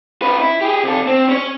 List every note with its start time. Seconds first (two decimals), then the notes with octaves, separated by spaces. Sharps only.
0.22 C#4 B4
0.39 E4
0.61 G4 G#4
0.84 C3 A4
1.07 C4
1.28 C#4 C#5